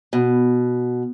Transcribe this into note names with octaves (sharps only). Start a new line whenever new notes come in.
B2